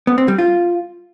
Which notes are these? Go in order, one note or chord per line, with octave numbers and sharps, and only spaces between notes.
B3
C4
G3
F4